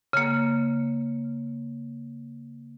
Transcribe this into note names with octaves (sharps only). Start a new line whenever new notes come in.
C#3 A#3